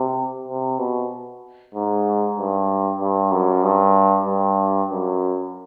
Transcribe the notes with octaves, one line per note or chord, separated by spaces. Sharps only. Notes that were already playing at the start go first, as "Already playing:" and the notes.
Already playing: C3
C3
B2
G#2
G2
G2
F#2
G2
G2
F#2